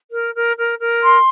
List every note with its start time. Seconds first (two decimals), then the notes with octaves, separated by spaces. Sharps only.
0.11 A#4
0.34 A#4
0.56 A#4
0.79 A#4
1.02 C6